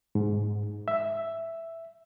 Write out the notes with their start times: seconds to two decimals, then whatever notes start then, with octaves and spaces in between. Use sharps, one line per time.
0.15 G#2
0.88 E5